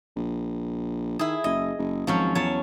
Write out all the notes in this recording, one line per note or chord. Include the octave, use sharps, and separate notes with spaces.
A#1
D#3 E4 G#4
F#1 D#5
F#1
G#1 F3 F#3 C#4
E2 F#3 C#5 A5